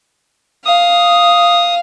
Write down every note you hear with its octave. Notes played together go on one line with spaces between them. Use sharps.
F5 D#6